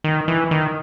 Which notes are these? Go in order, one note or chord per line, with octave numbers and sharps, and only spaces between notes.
D#3
E3
D#3